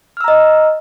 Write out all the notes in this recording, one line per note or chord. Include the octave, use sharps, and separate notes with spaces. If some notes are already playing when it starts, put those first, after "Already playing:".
D#5 A#5 E6 F6